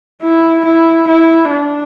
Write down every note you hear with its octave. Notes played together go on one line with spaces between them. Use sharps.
E4
E4
E4
D4